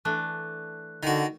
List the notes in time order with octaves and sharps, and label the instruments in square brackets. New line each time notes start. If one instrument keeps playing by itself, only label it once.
[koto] E3 A3 D4 [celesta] F#6
[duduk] D3 [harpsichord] D#3 F#4